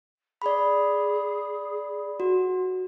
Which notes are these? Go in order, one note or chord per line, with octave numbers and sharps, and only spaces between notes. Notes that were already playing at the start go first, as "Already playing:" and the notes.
G#4 D5 B5
F#4